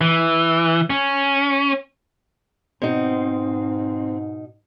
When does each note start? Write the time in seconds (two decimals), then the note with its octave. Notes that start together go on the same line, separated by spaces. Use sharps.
0.01 E3
0.90 C#4
2.82 G#2 B2 C4 D#4